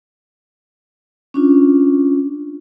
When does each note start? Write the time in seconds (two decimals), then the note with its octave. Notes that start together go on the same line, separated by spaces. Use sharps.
1.34 C#4 D4 F4